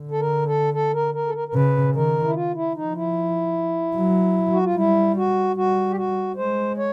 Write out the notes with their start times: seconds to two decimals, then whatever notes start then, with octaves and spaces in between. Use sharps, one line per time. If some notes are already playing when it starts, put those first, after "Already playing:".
Already playing: D3
0.11 A4
0.20 A#4
0.47 A4
0.74 A4
0.94 A#4
1.14 A#4
1.27 A4
1.35 A#4
1.48 A#4
1.54 C#3 B4
1.95 D#3 A#4
2.24 E4
2.34 F4
2.55 E4
2.75 F3 D#4
2.95 E4
3.95 F#3
4.52 F#4
4.63 F4
4.75 G3 E4
5.16 F#4
5.56 G3 F#4
5.90 G4
5.96 F#4
6.36 G#3 C5
6.78 C#5